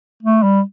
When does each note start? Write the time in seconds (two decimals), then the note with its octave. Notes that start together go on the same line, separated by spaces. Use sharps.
0.23 A3
0.43 G3